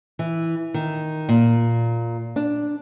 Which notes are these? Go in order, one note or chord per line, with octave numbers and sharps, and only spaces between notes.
E3
D#3
A#2
D4